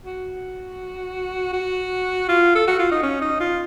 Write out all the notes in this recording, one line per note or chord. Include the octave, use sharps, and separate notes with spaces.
F#4
F#4
F4
A4
F#4
F4
D#4
C#4
D#4
F4